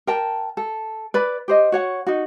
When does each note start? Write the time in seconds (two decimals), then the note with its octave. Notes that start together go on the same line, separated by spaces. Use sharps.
0.07 A#4 G5 A5
0.57 A4
1.14 B4 D5 B5
1.48 G4 C5 D#5
1.72 F#4 C#5 F#5
2.07 D#4 F#4